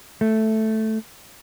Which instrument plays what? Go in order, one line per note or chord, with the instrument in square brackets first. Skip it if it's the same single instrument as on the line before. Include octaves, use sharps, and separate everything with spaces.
[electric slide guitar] A3